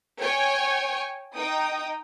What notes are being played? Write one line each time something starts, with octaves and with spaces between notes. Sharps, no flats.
C#5 G5 G#5 C#6
D#4 G5 D#6